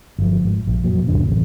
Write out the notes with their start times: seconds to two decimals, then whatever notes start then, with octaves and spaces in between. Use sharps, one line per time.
0.18 G1 F3
0.44 G#2
0.67 A#1
0.83 F2 A#2 F#3
1.07 D1 C2 F#2 D3
1.29 A1 C3